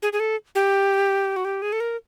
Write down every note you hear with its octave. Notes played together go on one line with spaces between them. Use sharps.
G#4
G#4
A4
G4
F#4
G4
G#4
A4
A#4